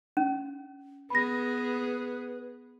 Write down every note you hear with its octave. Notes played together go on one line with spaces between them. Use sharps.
C#4
B3 G#4 B4 B5 A#6